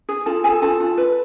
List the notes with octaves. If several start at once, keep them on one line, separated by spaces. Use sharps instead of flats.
G#4
F4 A4 A5
G#4 A4 G#5
F4 A4 A5
F4
B4